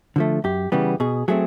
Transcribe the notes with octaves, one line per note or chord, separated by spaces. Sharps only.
D3 F3 A3
F#2 G4
C#3 E3 G3 B3 G4
B2 G#4
F#3 A3 C4 G#4